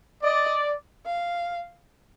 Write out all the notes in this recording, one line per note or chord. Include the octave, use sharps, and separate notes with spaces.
D5 D#5
F5